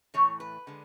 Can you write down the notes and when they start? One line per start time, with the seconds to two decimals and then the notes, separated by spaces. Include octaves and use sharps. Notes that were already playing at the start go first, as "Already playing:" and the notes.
0.14 A2 E3 A3 C#5
0.40 B4
0.67 D3 G#3